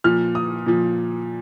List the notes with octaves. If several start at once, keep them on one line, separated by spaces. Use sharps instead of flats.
A#2 F3 F6
D#6
A#2 F3